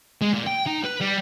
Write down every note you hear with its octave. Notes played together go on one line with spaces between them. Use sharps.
G#3
A#2
G5
D#4
B4
G3